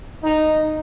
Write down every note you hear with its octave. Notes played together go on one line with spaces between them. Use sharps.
D#4